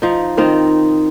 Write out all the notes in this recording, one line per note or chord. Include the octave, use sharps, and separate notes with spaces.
F3 D#4
D#3 C4 D#4 F4